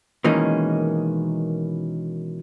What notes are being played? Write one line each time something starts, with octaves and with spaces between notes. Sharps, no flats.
B2 D#3 E3 G#3 A#3 C#4